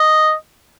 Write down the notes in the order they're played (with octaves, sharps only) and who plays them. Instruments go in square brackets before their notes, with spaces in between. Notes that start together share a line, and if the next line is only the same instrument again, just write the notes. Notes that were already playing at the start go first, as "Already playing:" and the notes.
Already playing: [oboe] D#5